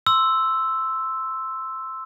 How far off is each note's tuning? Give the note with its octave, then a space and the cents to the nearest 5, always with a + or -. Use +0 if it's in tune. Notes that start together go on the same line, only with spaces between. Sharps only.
C6 +0 E6 +0